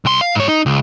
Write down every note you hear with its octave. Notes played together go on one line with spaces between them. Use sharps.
C2 C6
F5
G#2 C#5
D#4
C#2